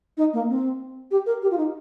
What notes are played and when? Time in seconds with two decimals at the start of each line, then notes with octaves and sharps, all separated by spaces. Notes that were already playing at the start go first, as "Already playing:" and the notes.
0.17 D#4
0.33 A#3
0.49 C4
1.11 G4
1.26 A#4
1.42 G4
1.51 F4
1.58 D#4